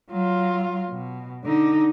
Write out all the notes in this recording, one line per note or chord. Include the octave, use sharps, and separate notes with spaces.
F#3 F4
B2
D3 D#4